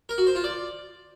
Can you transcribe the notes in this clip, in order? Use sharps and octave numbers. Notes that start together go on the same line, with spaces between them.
A#4
F#4
C5
F4
D5